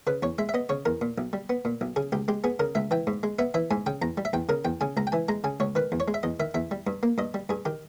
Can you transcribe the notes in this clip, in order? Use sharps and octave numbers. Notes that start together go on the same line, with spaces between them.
C#3 B4
E2 C#5
G#3 E5
E5
B3 D#5
C#3 C#5
E2 A#4
A#2
B1
G3
B3
A#2
B1
C#3 G#4
C#2 G4
G#3 G4
B3 G#4
C#3 A#4
C#2 E5
E3 G5
G#2
G#3
B3 E5
E3 E5
G#2 G#5
C#3 G5
E2 A#5
G3
E5
E2 G5
C#3 A#4
E2 G5
C#3 G#5
C#2 A#5
G5
E3 G#5
G#3 A#5
C#3 G#5
C#2 C#5
D#3 B4
E2
C#5
G#3
E5
E2 D#5
D#3 E5
E2 E5
G3
G2
A#3
G2 D#5
G3
G2 G#4
D#3 G4